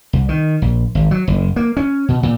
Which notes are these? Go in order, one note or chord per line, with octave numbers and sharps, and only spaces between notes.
C2
D#3
A#1
G#1
F#3
F#1
A#3
C#4
B2
A#2